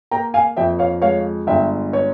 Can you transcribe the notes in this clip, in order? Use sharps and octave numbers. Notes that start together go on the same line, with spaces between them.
A#3 G5 A#5
F5 G#5
F2 E5 G5
C#5 F5
G#3 C#5 F5
G1 E5 G5
C#5